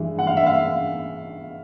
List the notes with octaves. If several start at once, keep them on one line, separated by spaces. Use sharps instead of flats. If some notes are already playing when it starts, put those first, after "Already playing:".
Already playing: G2 E3 G#3
F#5
F5
E5
F5